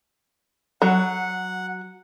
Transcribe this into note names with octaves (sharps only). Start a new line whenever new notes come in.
F#3 F#5